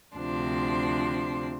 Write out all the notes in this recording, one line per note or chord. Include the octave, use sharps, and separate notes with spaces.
D2 C3 F3 D4 C6